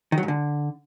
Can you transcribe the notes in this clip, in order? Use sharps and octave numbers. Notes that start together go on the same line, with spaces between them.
D#3
F#3
G#2
D3